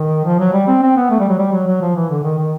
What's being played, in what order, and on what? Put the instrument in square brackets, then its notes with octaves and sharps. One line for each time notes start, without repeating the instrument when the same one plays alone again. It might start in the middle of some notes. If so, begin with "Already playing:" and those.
Already playing: [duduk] D#3
F3
F#3
G3
C4
C4
B3
A3
G3
F#3
G3
F#3
F#3
F3
E3
D3
D#3
D#3